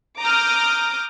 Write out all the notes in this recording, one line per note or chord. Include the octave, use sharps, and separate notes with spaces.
A#5 D6 D#6 F6 G6